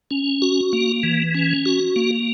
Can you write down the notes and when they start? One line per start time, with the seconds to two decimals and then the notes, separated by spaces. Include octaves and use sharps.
0.11 C#4
0.42 F#4
0.73 A#3
1.03 E3
1.34 C#4
1.66 F#4
1.96 A#3